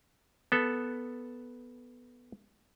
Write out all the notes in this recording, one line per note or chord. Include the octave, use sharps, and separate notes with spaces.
B3 A4